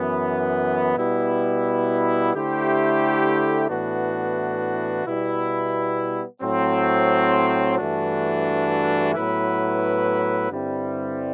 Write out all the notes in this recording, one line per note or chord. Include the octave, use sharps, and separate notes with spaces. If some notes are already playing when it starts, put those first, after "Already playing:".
Already playing: F#2 E3 B3
B2 G3 B3 E4
D3 A3 E4 G4 C5
A2 E3 B3 D4 F#4
B2 G3 B3 E4
A2 F#3 C4
G2 E3 A3 D4 F#4
A2 F#3 B3 E4 B4
G2 D3 G3 C4 E4